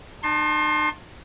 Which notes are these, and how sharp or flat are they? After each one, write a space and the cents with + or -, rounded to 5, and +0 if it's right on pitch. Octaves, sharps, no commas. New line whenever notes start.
D#4 -45 A5 +0 C6 +30